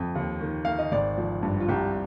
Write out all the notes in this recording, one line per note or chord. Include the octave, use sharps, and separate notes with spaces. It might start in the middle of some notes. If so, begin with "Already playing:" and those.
Already playing: F2
D#2
D#3
D#3 F5
D#5
G#1 D5
F3
G2
F4
C2 G4